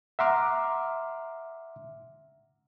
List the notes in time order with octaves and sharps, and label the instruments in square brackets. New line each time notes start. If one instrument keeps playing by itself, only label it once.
[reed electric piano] E5 F#5 A#5 C6 D6 F6